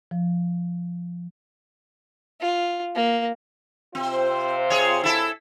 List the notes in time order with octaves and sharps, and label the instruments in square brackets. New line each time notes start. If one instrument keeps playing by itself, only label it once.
[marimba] F3
[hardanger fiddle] F4
A#3
[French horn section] C3 F4 C5 [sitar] C4
[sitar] G#4 C#5
E4 A4